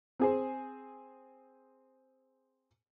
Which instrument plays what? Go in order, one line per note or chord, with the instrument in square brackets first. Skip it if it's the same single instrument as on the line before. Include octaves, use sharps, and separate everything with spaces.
[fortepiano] C4 G#4 C5